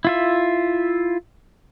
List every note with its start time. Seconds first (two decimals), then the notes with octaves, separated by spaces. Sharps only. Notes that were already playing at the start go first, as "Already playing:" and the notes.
0.05 E4 F4 E5